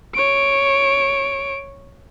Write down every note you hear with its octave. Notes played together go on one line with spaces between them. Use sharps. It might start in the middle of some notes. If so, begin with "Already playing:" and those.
C#5 D7